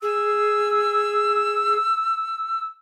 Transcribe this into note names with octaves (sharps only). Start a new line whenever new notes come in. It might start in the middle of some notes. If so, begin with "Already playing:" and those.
G#4 E6